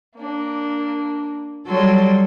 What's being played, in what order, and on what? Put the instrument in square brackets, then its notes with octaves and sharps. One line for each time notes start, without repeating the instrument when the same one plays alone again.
[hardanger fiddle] A#3 D4
[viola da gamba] F#3 G3 [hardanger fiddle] A4 C6